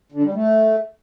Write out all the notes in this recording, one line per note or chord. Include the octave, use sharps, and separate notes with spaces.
D3
G3
A3